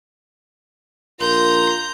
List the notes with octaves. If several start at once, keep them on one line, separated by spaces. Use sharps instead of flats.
A#1 F4 A#4 A#5 C6 G6